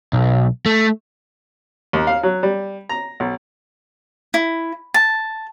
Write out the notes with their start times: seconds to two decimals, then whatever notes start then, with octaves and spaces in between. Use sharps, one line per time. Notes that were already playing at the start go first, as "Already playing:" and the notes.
0.13 B1
0.66 A3
1.93 D#2
2.07 F5
2.23 F#3
2.43 G3
2.89 A#5
3.20 B1
4.34 E4
4.94 A5